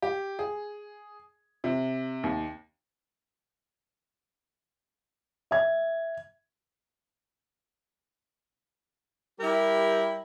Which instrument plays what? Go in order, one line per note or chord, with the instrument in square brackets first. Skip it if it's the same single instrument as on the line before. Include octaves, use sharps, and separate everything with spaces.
[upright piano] G4
G#4
C3
D#2
[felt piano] E5 G#6
[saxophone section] G3 E4 G4 A#4